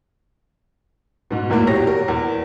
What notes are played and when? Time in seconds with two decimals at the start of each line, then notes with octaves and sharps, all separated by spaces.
1.31 G#2 B2
1.50 G#1 E2 A2 A#3
1.67 B2 G4 C#5 A#6
1.87 A#4
2.08 E2